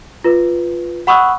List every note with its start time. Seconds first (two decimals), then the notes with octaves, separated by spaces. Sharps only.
0.24 F4 B4
1.07 F#5 B5 C#6 D#6 E6 F#6